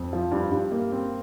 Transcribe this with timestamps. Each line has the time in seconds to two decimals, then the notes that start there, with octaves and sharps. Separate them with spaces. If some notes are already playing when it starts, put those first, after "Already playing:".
Already playing: F2
0.13 F3
0.32 G2
0.52 G2
0.72 A#3
0.92 C4